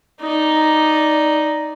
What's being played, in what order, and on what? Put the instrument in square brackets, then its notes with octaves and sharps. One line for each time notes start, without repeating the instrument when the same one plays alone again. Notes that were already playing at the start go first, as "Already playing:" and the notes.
[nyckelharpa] D#4 D5